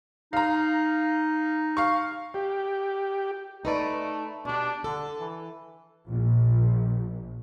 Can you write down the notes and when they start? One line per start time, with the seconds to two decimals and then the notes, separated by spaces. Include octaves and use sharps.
0.33 D#4 F5 A#5
1.77 F5 C#6
2.34 G4
3.65 A3 D#4 B4 D5
4.45 B2 D4 G4
4.84 D3 A4
5.20 E3
6.09 A#1